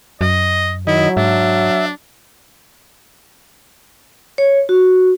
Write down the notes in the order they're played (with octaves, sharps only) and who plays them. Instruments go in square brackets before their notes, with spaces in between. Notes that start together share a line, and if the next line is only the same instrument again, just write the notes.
[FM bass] F#2 [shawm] D#5
[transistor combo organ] D#3 D#5 [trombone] F#3 [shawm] E4
[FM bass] G#2 [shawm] D4 [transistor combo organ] E5
[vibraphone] C#5
F#4